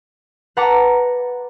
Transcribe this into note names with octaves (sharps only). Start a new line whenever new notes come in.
B4 F#5 A5 A#5 D6 C#7